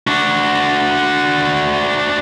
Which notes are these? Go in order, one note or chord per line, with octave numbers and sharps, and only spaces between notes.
D4 F#4